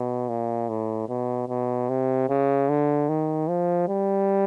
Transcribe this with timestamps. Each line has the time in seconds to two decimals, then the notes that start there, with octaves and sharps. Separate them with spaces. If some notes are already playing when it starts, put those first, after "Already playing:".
Already playing: B2
0.29 A#2
0.69 A2
1.09 B2
1.49 B2
1.89 C3
2.29 C#3
2.69 D3
3.09 D#3
3.49 F3
3.88 G3